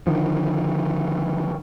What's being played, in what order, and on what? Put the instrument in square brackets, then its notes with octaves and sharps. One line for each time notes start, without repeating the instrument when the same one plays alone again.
[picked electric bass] D3 D#3 F3